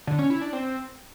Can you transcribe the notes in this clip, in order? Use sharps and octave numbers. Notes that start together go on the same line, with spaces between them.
D3
C#4
E4
D4
C4